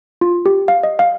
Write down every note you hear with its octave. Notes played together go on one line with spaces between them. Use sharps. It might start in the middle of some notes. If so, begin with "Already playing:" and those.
F4
G4
F5
D#5
F5